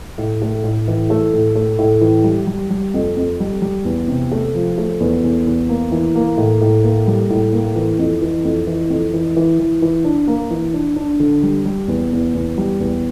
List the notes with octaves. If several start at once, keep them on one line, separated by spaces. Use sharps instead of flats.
A2
A3
A2
E3
A3
A2
A3
A2
E3
G3
G3
G3
F2
F2
G3
G3
E2
C3
A3
F3
A3
E2
E2
E2
A#3
E3
A#3
A2
A2
A#3
G3
A2
A#3
E3
F2
E3
F2
E3
F2
E3
E3
E3
E3
D4
A#3
E3
D4
D4
D3
G3
G3
E2
E2
E2
G3
E2